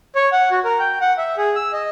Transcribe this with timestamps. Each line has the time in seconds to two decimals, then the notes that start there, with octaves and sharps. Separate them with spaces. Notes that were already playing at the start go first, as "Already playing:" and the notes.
0.16 C#5
0.32 F#5
0.51 F#4
0.65 A#4
0.79 G5
1.01 F#5
1.18 E5
1.38 G#4
1.56 E6
1.73 D#5